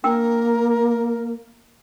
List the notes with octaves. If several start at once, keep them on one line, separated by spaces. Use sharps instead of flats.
A#3 D4 A#4 G5 E6